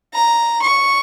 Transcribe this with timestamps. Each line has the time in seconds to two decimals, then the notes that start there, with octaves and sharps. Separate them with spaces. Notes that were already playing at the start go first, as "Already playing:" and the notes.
0.14 A#5
0.62 C#6